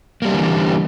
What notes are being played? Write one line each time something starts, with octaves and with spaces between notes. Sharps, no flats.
D3 E3 G3 G#3 A#3